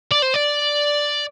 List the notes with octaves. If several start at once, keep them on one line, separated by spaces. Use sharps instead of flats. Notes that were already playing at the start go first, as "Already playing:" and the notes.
D5
C5
D5